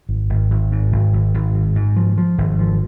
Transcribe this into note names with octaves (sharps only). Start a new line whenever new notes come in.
G#1
G#1
G#1
G#2
G#1
G#1
G#1
G#2
G#2
F3
F3
G#1
F3